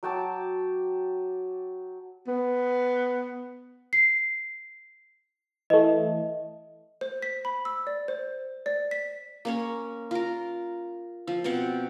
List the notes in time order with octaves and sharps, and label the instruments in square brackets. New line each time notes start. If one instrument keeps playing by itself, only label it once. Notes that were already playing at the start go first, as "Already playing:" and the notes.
[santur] F#3 G5 A5 D6
[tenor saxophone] B3
[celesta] C7
[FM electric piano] E3 A3 [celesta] D#5
[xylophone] C5
B6
B5
E6
D5
C5
D5
B6
[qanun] A#3 C#4 C#5
F4 A#4
F3
B2 F3 C4 F#5